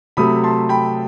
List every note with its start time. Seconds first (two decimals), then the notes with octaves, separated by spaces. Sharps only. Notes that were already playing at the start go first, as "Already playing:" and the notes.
0.17 C3 F#3 A3 B5 D#6
0.44 A5 C6
0.69 G5 B5